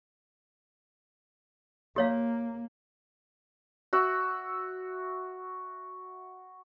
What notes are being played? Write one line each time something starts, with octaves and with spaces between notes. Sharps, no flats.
A#3 G4 C#5 F5
F#4 E5